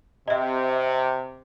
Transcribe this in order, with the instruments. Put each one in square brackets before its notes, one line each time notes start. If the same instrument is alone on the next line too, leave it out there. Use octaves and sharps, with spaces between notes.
[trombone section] C3 [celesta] D#5 E5